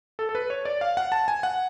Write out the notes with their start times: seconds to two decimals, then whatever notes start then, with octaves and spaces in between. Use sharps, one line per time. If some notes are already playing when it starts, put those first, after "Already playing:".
0.19 A4
0.29 A4
0.35 B4
0.50 C#5
0.65 D5
0.81 F5
0.97 F#5
1.12 A5
1.28 G#5
1.43 F#5